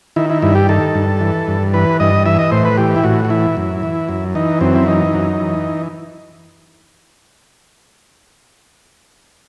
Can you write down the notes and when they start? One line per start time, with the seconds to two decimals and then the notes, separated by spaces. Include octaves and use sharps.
0.16 D#3 E4
0.30 E4
0.42 G2 E4
0.55 G4
0.69 D#3 A4
0.95 G2
1.20 E3
1.48 G2
1.74 E3 B4
2.00 G2 D#5
2.26 E3 E5
2.39 D#5
2.52 A2 C5
2.65 B4
2.77 E3 G4
2.96 E4
3.04 A2 F#4
3.25 F#4
3.30 E3 E4
3.57 F#2
3.83 E3
4.09 F#2
4.35 E3 D#4
4.61 F#2 C4
4.76 E4
4.87 E3 D#4
5.14 F#2
5.40 E3